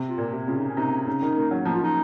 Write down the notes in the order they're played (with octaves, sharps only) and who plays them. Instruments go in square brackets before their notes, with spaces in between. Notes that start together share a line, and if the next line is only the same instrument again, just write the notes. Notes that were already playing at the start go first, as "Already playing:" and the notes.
Already playing: [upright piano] C3
[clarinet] F4
[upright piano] A#2
C3
[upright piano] C#3 [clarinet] F4
[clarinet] D#4
C#4
[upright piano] C3 [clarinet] D#4
[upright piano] C#3 [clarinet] D#4
[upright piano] D#3
A#3
F#3
[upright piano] F3 [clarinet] D#4
[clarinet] F4
D#4